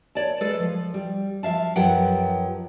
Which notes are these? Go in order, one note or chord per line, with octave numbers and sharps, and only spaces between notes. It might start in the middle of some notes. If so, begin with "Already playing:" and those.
C#5 D5 A5
G#3 A4 B4 D5
F3
G3
F3 E5 F5 A5
F#2 F3 G4 B4 F#5 G5